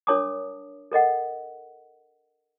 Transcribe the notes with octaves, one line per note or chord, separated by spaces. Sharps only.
D4 A#4 C#5 A5 D6 D#6
A4 A#4 D#5 F#5